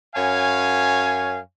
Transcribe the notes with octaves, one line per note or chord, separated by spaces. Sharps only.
F#2 C#5 F5 G#5